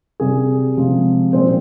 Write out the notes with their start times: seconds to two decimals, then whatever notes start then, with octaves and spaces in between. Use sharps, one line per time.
0.20 C3 G3 G#4
0.77 C3 F3 G#3
1.33 A#2 F3 G#3 C4 C5